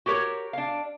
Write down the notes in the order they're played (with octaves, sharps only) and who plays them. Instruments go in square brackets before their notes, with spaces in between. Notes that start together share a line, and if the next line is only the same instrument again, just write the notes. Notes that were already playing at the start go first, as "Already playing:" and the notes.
[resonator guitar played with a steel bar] F#4 G4 A#4 C5 C#5
D4 F5